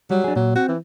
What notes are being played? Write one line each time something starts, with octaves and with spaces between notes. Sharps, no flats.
F#3 G3
D4 G#4
A#2 F#3
C4 F#4
E3